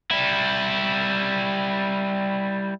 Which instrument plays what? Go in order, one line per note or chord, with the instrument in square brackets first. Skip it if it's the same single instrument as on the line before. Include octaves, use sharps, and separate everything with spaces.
[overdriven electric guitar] G3 E4